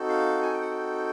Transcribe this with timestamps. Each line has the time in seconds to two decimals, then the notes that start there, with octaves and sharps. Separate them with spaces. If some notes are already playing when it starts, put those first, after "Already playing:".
Already playing: C4 D#4 F#4 A4
0.09 F5
0.42 G#5
0.53 G5
0.61 F#5
0.71 G5